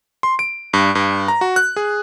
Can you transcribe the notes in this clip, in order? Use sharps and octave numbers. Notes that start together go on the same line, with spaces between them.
C6
D7
G2
G2
A#5
F#4
F#6
G#4